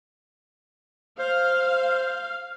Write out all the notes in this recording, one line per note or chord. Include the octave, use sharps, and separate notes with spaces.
C5 F5